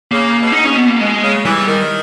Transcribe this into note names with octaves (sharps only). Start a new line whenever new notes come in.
C#3 A#3
B2
D#4
C#3 C#4
B2
B3
A#3
B2 G#3
C#3
E3 G3
D#3